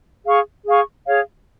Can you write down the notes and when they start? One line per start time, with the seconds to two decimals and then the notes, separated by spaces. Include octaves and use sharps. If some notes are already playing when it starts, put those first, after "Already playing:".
0.26 G#4 F5 C#6
0.66 G#4 F5 C#6
1.06 G#4 C#5 F5